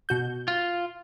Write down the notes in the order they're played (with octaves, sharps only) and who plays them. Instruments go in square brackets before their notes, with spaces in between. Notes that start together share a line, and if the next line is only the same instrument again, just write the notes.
[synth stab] B2 F#4 G6
[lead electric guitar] F4